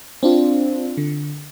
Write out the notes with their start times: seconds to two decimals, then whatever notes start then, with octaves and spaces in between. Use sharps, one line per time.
0.23 C4 D4 F4
0.97 D3